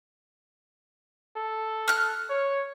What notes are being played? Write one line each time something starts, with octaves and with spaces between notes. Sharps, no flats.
A4
F6 F#6
C#5